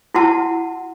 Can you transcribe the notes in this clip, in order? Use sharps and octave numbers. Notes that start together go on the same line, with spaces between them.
E4 F#4 F#5 A5